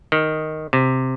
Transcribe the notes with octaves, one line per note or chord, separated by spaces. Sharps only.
D#3
C3